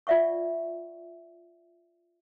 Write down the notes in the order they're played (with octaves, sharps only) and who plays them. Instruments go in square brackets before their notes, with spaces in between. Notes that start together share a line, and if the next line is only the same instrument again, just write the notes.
[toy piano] F4 D5 E5 F#5 C#6